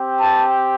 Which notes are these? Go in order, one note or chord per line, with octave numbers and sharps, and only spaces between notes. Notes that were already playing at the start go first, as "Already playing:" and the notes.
Already playing: C4 G4
A5